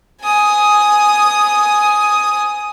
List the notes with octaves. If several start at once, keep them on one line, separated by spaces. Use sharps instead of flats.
G#5 D#6